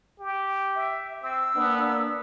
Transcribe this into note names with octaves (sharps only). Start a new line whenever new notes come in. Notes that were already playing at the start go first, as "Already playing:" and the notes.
G4
E5
C4 E6
A#3 B3 D4